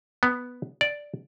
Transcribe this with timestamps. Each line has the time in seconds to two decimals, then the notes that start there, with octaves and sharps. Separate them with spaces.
0.23 B3
0.81 D5